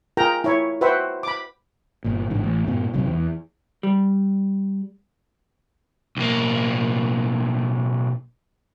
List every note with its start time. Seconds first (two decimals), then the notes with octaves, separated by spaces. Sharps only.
0.17 F4 G#4 A#4 G5 A#5
0.44 E4 C#5
0.81 F#4 B4 C5 E5 F#5 G5
1.23 B5 D6
2.04 G1 A#2
2.30 A1 G#2 D3
2.43 A1
2.67 G2 A#2 B3
2.93 F#1 C3 F#3
3.07 E2
3.83 G3
6.17 B1 A#3